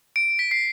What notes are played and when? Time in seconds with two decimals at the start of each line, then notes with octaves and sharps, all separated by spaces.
0.16 D7
0.39 B6
0.51 C7